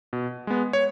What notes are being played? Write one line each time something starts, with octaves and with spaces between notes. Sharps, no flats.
B2
G#3 B3
C#5